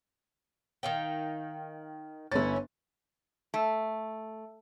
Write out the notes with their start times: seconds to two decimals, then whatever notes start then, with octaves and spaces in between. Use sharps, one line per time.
0.83 D#3 F5 G5
2.32 G1 C#4 E4 A6
3.54 A3